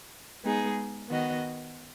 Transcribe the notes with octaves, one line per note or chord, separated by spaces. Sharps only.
G#3 B3 D#4 G#4
D#3 B3 F#4 D#5